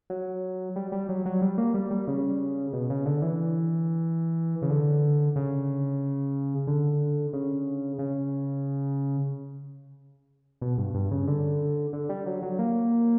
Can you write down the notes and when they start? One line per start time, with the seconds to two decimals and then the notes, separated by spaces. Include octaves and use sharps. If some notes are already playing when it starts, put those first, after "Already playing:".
0.10 F#3
0.76 G3
0.92 G3
1.09 F#3
1.26 F#3
1.42 G3
1.58 A#3
1.74 G3
1.91 G3
2.07 C#3
2.73 B2
2.90 C#3
3.06 D3
3.22 E3
4.62 C#3
4.70 D3
5.36 C#3
6.67 D3
7.33 C#3
7.99 C#3
10.61 B2
10.78 G2
10.94 G2
11.11 C#3
11.27 D3
11.93 D3
12.09 G3
12.26 F#3
12.42 F#3
12.59 A#3